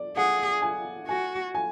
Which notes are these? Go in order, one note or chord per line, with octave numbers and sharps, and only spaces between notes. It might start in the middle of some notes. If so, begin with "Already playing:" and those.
Already playing: D5
G#4 F#5
G#5
F#4 G#5
G#5